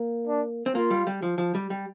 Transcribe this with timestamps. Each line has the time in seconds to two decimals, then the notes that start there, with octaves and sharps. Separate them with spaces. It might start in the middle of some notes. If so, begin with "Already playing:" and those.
Already playing: A#3
0.27 D4
0.66 C4
0.75 A#3 F4
0.91 G3
1.07 G3
1.22 F3
1.38 F3
1.55 G3
1.70 G3